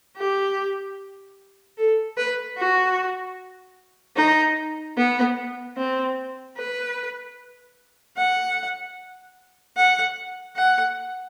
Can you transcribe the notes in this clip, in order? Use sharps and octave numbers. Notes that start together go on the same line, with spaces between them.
G4
A4
B4
F#4
D#4
B3
C4
B4
F#5
F#5
F#5